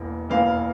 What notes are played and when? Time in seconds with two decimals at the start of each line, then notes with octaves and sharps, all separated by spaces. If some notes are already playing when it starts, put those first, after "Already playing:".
Already playing: E1 E2 E3 A#3
0.29 E1 E2 E3 A#3 F5